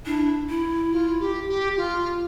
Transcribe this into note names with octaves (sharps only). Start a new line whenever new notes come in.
D4 E4
E4
F4
G4
G4
F4